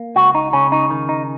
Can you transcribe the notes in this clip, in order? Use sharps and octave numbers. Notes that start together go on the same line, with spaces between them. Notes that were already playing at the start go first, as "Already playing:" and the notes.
Already playing: A#3
C#2 F#4
D#4
C#3 C#4
D#4
D#3
D#4